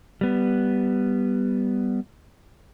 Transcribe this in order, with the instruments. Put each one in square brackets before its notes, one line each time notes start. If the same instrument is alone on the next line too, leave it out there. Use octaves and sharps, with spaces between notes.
[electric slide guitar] G3 B3